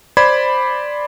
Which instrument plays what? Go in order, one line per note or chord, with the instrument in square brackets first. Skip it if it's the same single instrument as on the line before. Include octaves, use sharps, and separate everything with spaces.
[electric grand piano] C5 D5 B5 G#6